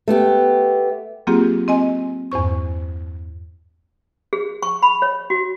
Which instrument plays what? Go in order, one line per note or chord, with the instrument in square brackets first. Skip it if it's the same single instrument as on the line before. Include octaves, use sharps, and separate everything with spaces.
[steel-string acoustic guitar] A3 B3 G4
[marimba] F#3 A#3 C4 F4 G4 G#4
C4 D#5 G#5
E2 G2 C5 C#6
[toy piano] G#4
C#6
B5
C#5
F#4